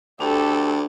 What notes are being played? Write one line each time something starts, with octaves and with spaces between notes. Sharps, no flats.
D2 D4 G4 A4